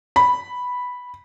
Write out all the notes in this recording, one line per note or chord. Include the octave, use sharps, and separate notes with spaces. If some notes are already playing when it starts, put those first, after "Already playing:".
B5